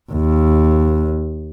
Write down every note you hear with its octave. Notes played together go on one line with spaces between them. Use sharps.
D#2